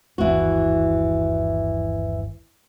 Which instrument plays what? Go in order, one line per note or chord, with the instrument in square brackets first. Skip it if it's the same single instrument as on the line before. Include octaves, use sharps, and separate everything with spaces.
[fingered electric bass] G1 D#2 [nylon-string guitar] E3 F#4